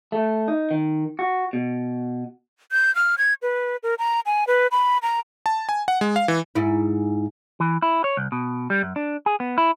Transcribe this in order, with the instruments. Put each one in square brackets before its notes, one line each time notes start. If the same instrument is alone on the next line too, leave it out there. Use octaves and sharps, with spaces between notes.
[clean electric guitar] A3
D#4
D#3
F#4
B2
[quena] G6
F6
G#6
B4
A#4
A#5
G#5
B4
B5
A#5
[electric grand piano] A5
G#5
F#5
G#3
F5
E3
[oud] G#2 E4
[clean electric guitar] E3
E4
C#5
C2
B2
G3
F#2
D4
G#4
B3
E4